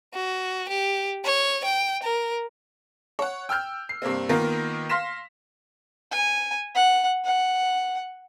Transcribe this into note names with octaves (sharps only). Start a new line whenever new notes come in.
F#4
G4
C#5
G5
A#4
C#5 F#5
G5 E6 F6 G6
C7
G2 C3 A#3 C4
D#3 A#3 B3 F4 A#4
F5 C6 F6 A#6 B6 E7
G#5
F#5
F#5